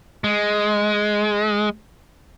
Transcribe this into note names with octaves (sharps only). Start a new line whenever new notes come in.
G#3